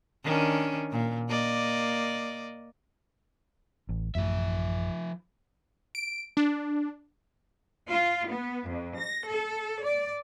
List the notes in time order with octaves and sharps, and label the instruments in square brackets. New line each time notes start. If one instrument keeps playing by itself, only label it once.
[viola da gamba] D#3 C#4 D4
A#2
A#3 D5 D#5
[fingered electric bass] A1
[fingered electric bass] A1 F#2 A3 [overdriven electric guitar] F3 E5
[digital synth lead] D7
D4
[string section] F4
B3
F2
A#6
A4
D5